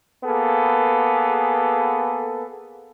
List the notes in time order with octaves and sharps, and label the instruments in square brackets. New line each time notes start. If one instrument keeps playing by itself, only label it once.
[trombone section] A#3 B3 G#4 A4